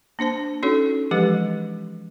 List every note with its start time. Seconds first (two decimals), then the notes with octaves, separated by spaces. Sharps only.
0.19 A#3 D4 C5 A5
0.63 C#4 D#4 F#4 A4 C#5
1.11 E3 F3 G#3 G4 G#4 B4